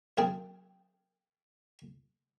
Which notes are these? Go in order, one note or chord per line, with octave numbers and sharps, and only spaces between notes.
F#2 A#3 C4 G#4 G5 A5